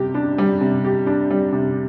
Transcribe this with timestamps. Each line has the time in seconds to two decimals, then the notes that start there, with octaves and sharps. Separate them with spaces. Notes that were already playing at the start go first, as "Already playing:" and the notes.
Already playing: C3 G3 G4
0.14 D4
0.38 G3
0.61 C3
0.84 G4
1.07 D4
1.30 G3
1.52 C3